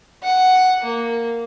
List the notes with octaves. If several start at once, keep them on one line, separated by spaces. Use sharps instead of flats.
F#5
A#3